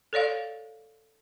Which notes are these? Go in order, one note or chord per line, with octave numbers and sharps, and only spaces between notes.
A4 C#5 D5 F5